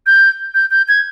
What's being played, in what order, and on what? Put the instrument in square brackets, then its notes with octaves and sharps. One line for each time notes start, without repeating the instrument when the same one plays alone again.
[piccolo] G6
G6
G6
G#6